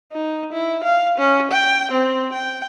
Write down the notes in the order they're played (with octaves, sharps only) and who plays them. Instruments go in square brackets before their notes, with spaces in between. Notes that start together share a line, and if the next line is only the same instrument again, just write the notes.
[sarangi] D#4
E4
F5
C#4
G5
C4
G5